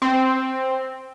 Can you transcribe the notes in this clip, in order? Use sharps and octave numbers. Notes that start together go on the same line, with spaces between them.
C4